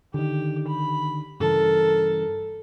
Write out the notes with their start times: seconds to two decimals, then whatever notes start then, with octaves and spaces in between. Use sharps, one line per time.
0.14 D3 D#3 G4
0.68 B5
1.40 G2 C#3 E3 A4 A#4